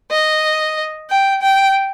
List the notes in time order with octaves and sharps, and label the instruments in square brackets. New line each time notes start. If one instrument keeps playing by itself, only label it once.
[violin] D#5
G5
G5